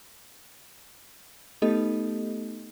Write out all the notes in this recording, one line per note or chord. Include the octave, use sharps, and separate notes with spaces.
A3 B3 D#4 G4 A4 D#5